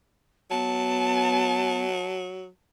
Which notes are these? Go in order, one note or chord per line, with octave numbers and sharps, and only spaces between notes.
F#3 B3 A5